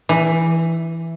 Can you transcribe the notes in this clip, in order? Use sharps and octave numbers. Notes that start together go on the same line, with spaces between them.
E3